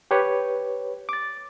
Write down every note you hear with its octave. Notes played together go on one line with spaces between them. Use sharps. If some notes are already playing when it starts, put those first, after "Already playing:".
G4 B4 C#5
D6 A6